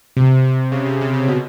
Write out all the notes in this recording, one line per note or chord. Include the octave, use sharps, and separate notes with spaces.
C3
C3
C#3
C3
C#3
C#3
B2